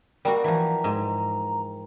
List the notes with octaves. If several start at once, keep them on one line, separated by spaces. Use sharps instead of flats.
G3 A#3 F#4 A#4 G5
E3 F3 A#5
G#2